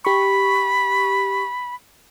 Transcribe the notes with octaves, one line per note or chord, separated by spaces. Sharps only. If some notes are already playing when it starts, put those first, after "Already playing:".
G4 B5 C#6